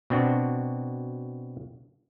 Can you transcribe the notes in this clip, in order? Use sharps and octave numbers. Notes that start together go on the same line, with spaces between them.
B2 C4 D4 F#4